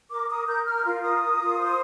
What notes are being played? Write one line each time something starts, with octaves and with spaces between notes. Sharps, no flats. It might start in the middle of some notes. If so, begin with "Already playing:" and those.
A#4 D6
A#4 D#6
A#4 G6
A#4 F6
F4
A#4 D#6
A#4
F4
C5